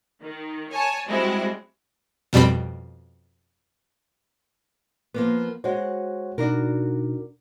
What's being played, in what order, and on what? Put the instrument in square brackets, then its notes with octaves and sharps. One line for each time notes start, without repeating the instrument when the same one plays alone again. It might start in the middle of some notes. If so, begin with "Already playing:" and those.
[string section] D#3
C#5 G#5 A5
G3 G#3 C4 E4 F#4
[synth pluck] F2 B2 G3 C4 B5
[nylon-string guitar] F3 A#3 B3
[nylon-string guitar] G#3 F#4 [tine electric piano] C5 C#5 F#5
[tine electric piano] B2 D#4 [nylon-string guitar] D4 F#4 A#4